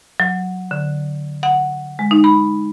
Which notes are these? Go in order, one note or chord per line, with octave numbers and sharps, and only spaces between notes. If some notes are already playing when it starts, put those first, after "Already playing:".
F#3
D3
F#5
G#3
D#4
B5